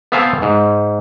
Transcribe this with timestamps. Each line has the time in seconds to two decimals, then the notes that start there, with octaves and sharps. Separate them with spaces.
0.12 B3 C4 E5 F5 G#5 A5
0.42 G#2